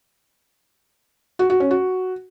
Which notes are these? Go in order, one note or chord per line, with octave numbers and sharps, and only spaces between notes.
F#4
F#4
C#4
F#4